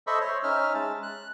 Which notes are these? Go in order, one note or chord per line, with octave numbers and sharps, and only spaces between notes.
A4 C5 D#5 E5 B5 C#6
C5 C#5
C#4 D#4 E5 F6
G#3 A5
F#6